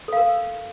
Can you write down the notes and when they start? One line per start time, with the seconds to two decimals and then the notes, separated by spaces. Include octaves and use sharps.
0.08 A4
0.13 F5
0.17 A#4